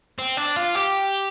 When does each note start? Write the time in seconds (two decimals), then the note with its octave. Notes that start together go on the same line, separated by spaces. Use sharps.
0.19 C4
0.37 D4
0.56 F4
0.75 G4